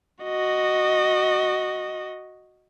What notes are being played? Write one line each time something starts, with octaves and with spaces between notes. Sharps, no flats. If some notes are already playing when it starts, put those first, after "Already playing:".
F#4 D#5